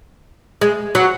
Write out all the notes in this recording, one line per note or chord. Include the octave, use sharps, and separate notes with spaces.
G#3
F#3